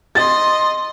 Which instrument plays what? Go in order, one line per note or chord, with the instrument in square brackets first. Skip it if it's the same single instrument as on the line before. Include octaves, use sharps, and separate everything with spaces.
[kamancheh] D#5 C6 [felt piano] A6